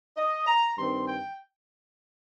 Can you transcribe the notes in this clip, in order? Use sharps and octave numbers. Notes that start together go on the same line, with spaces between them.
D#5
A#5
G2 D#3 C4 C6
G5